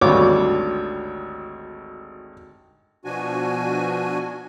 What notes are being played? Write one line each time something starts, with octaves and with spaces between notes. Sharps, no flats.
G#1 D2 G3 C#5 D6
B2 F3 D4 F#4 G#5